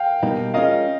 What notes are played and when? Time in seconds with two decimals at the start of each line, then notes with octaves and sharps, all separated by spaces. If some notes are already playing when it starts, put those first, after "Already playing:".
Already playing: F5 G5
0.23 B2 G3 A#3 D#4
0.54 G#3 C#4 F4 A#4 D#5 F5